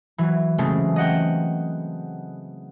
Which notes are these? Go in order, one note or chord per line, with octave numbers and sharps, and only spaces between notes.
E3 F#3
C#3 E3 G#3 A3 C4
D#5 F#5 G5